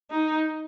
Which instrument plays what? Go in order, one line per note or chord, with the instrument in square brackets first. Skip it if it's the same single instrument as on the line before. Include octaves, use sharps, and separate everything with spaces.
[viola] D#4